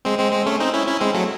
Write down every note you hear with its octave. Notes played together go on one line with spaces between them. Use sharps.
G#3 C4
G#3 C4
G#3 C4
A3 C#4
C4 D#4
C#4 E4
C#4 E4
G#3 C4
F#3 A3